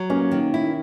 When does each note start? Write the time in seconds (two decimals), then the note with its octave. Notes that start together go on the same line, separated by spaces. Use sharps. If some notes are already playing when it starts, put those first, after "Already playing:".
Already playing: F#3
0.10 A#3 C#4
0.31 D#3
0.54 E4